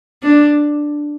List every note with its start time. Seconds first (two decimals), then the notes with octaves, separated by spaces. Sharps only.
0.23 D4